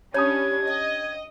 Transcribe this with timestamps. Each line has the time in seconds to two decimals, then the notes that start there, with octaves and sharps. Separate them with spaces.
0.14 G3 C#4 D4 E4 C#5 A5 D#6 G#6
0.67 D#5 G5